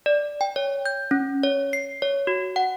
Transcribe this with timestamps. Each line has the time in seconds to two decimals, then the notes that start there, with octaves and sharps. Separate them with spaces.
0.06 D5
0.41 G5
0.56 C#5
0.86 G6
1.11 C#4
1.43 C#5
1.73 C7
2.02 C#5
2.27 F#4
2.56 F#5